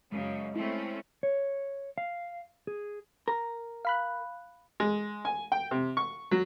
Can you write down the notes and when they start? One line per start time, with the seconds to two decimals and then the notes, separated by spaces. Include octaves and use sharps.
0.12 F#2 C#3 G#3
0.56 A3 C4 C#4 E4
1.23 C#5
1.98 F5
2.67 G#4
3.28 A#4
3.85 F5 B5 F#6
4.80 G#3
5.25 G#5
5.52 G5
5.71 C3
5.97 C#6
6.31 F#3